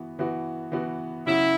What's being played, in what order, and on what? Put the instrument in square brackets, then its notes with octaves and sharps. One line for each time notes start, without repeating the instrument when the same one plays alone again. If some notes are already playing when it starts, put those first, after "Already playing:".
Already playing: [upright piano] E3 B3 F#4
E3 B3 F#4
E3 B3 F#4
[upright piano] C#3 F#3 C#4 F#4 [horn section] E4